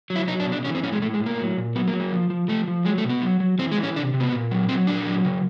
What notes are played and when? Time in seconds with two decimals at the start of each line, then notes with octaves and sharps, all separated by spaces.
0.10 F#3
0.16 E4
0.28 F#3 D#4
0.40 D4
0.46 B2
0.52 D4
0.65 E3 C#4
0.75 C4
0.83 A2 C#4
0.93 G#3
1.02 A2 A3
1.14 G#3
1.20 A2
1.26 A#3
1.39 F#3
1.57 A#2
1.75 F#3 B3
1.88 A#3
1.93 F#3
2.00 A#3
2.12 F3
2.30 F3
2.48 F3 A3
2.68 F3
2.85 F#3 G#3
2.98 A3
3.04 B2
3.10 B3
3.22 F#3
3.40 F#3
3.59 E3 C4
3.72 G#3
3.77 E3
3.83 C#4
3.96 C3 D4
4.14 C3
4.20 B3
4.32 A#2
4.51 F#3
4.69 F#3 C4
4.87 A#2 D4
5.06 F#3
5.25 C#3